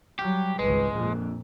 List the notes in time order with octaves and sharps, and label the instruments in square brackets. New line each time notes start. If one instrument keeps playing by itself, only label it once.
[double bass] F#3 G3 [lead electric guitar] G4
[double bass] G#1 C#2 [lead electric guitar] G#3 [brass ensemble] B4
[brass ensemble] A#1 [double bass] F2 A#2